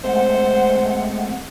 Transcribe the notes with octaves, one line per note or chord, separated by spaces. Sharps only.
G#3 A3 C4 C5 F#5